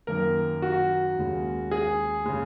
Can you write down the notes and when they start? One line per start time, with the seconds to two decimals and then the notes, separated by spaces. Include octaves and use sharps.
0.07 F#2 D#3 A#3 A#4
0.62 F#4
1.16 D#2 C#3 G#3
1.71 G#4
2.26 C#3 G#3